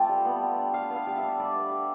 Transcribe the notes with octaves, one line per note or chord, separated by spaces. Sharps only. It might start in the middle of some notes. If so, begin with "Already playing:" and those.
Already playing: A3 C4 F4 D5 G5 A5
G3
B3
G3
D4
G3 F5
B3
F5
G3
E5
D4
G3 D5
B3
G3